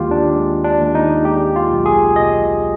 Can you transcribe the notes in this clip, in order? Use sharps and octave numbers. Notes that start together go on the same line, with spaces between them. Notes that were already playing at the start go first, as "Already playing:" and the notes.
Already playing: D#2 G#3 F4 G4
D4
G#3
D4
D#2
D#4
G#3 G4
F4
B1
G#4
B1 D#5